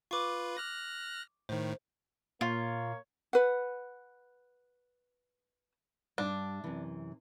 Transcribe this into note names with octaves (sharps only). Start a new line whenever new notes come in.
F4 B4 C#6 D6
F6 F#6 A#6
A2 D#3 C5
A#2 A#3 F4 C#5
B4 F#5
G2 G3 D4
F#2 C3 E3